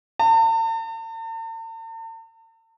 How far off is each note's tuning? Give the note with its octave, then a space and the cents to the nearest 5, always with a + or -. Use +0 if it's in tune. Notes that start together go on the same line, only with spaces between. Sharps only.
A5 +45